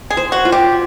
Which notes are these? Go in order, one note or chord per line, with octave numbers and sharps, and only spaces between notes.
G#4
C5
F#4
F4
G4